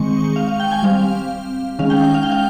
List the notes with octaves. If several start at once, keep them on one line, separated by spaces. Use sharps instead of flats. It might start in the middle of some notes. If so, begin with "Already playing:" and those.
Already playing: D#3 G#3 C4 C#6
F5
F5
G5
G#5
G3 C4 F5
D#3 G#3 C#4 F5
G5
F5
G5
F5